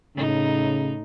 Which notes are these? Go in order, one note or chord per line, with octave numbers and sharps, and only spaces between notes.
A2 C#3 D#4